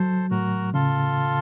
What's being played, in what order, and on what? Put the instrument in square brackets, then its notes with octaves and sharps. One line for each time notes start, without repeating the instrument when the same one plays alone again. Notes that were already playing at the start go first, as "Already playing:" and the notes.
Already playing: [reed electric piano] F#3 [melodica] A4 C5
[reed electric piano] A2 [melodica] F#4 A#4
[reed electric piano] C#3 [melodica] F4 A4